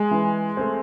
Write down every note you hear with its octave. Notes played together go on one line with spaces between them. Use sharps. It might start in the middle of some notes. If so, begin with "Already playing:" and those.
Already playing: G#3 G#4
E3
A3 C4